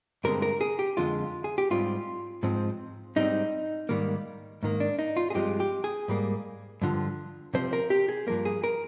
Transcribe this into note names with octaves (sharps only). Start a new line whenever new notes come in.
G2 D3 G#3 C4 A#4
A#4
G#4
G4
F2 D3 G#3 F4
G#4
G4
G#2 G3 C4 F4
G#2 F3 C4
G#2 G3 C4 D#4
G#2 D#3 G3 A#3
G#2 D#3 A#3
D4
D#4
F4
G#4
G2 F3 G#3 C4 G4
G4
G#4
G#2 G3 A#3
G2 D3 F3
C3 F3 C4 C5
A#4
G4
G#4
G2 F3 A#3 A#4
G#4
A#4